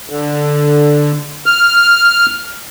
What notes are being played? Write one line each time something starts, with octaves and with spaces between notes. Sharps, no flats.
D3
F6